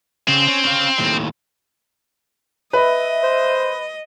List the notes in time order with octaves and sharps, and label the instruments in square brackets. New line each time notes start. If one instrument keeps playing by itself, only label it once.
[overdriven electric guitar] C#3 [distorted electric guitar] C4
[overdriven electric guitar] C#4
C#4 F5
D#2 A2
[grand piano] B4 [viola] D#5 [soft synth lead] E5
[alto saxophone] C5